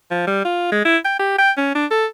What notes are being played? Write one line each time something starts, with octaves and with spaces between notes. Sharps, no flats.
F3
G3
F4
G#3
E4
G5
G4
G5
C#4
D4
A4